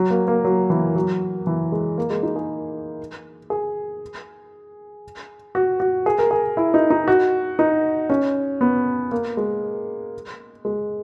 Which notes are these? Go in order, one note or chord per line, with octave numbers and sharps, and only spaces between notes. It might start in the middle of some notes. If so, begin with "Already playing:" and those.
Already playing: F#3
A#3
A#3
F#3
E3
F#3
E3
G#3
A#3
G#3
D#4
G#4
G#4
F#4
F#4
G#4
A#4
G#4
E4
D#4
D#4
F#4
D#4
C#4
B3
A#3
G#3
G#3